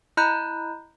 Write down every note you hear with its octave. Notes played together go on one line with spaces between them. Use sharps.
E4 D#5 A#5 B5 F#6 G6